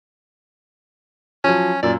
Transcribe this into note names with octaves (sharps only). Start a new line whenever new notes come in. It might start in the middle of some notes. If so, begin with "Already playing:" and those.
F3 F#3 C#4
F#2 A#2 D5